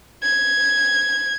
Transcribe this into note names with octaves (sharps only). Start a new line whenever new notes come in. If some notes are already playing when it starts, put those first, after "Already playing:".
G#6